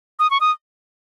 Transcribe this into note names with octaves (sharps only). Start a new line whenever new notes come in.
D#6
C#6
D#6